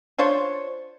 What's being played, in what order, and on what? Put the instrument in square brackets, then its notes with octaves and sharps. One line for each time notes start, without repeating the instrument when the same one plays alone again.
[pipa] D4 F4 C5 C#5